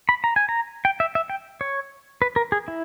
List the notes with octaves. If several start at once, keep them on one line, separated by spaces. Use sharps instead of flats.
B5
A#5
G#5
A#5
G5
E5
E5
G5
C#5
B4
A#4
G#4
E4